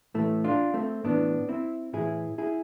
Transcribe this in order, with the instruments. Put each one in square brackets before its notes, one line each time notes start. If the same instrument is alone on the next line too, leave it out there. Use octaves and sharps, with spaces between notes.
[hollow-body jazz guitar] A2 E3 A3
D4 F4
A3 C4
A2 E3 B3 D4
C4 E4
A2 E3 E4 G#4
E4 G#4